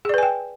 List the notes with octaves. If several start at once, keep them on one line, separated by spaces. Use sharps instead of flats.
G#4 B4 D5 G5 G#5